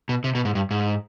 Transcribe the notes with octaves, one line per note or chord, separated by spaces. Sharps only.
B2
C3
B2
G#2
G2
G#2